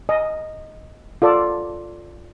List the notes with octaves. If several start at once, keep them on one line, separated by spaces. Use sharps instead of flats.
D#5
F4 A4 D5